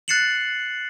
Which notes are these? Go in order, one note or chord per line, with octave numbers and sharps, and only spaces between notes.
F#6 A6 C7 C#7 E7 F#7